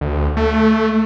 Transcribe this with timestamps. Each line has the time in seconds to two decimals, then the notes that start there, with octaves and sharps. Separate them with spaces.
0.01 D2
0.37 A3